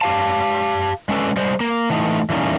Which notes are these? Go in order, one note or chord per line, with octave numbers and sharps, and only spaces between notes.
G4 F5 A5
G#3 C#4 D4 A4 B4
G3 G#3 C5
A#3
E3 A3 D#4
E3 G3 A3 A#3 C#4 D#4